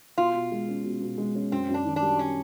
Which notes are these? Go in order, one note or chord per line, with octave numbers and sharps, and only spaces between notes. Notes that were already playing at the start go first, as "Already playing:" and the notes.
B2 F4
B2
G#3
C#4
B2
B2
G#3
C#4
F#2 C4
F#2
D4
D#3
D4
G3
C#4